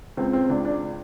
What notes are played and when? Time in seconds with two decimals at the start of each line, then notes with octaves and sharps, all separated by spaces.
0.17 C#2 C4
0.33 C4
0.49 C#2 D4
0.65 D4